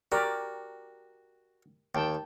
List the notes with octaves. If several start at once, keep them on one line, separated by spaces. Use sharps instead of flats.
F#4 G4 A#4 D5
D#2 G5 A5